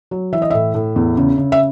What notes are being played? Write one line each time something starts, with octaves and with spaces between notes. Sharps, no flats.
F#3
E3 E5
D#5
A2 E5
A2
E2
C#3
C#3
E5